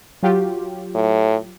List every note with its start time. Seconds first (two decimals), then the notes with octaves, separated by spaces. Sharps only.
0.23 F#3 F4 G4
0.95 A2